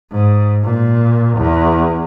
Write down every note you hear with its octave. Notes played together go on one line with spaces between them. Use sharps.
G#2
A#2
E2